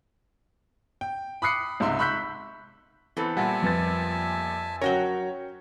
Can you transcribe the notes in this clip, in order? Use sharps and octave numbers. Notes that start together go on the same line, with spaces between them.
G5
B5 D6 D#6 F#6 C7 C#7
C#2 G#2 C3 E5 C6 E6
B5 C#6 E6 F#6 G6 B6
E3 B3 C4 A4
A#2 G3 E5 F#5 G#5 A5
F2 B4 A6
F#3 C#4 F#4 A#4 C#5 G5 G7